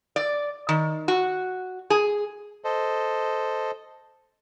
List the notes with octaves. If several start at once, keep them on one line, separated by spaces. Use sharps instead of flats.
D5
D#3
F#4
G#4
A4 C5 D#5